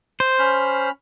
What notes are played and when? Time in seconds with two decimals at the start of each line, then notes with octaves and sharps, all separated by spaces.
0.20 C5
0.39 C#4 B5 F6